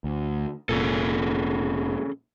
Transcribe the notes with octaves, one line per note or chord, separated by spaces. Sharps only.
D2
F1 A#2 C#4 G#4 A4